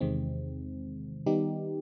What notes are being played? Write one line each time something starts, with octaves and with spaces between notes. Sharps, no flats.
E2 C3 D#3 G#3 C4
D#3 G3 B3 D#4 G4